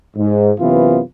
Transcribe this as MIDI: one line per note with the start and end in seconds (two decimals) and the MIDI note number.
0.17 0.51 44
0.59 0.99 42
0.59 0.99 48
0.59 0.99 52
0.59 0.99 59
0.59 0.99 65